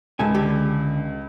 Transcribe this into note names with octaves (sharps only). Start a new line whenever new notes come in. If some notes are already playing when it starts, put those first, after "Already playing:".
C#2 G#2 A4 G#5
D3 G4 A4